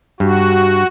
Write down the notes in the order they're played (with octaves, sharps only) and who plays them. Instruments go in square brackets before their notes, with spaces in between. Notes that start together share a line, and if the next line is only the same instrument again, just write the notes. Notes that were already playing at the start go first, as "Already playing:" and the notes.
[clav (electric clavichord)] G2 [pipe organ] F#4